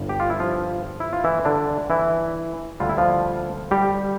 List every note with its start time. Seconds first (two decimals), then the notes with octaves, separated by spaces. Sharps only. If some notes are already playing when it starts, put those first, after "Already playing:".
Already playing: G1 G2
0.09 G4
0.20 F4
0.30 E4
0.40 F3 F4
1.00 E4
1.13 F4
1.24 E3 E4
1.45 D3 D4
1.90 E3 E4
2.80 D2 D3 G3 F4
2.89 E4
2.98 F3 F4
3.71 G3 G4